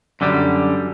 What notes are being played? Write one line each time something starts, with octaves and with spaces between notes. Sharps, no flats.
F#2 D3 G3